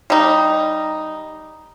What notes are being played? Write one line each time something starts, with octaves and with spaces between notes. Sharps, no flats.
G3 D#4